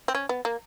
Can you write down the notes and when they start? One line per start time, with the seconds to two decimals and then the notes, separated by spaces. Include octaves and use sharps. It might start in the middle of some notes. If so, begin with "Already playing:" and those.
0.08 C4
0.15 C#4
0.29 B3
0.45 A#3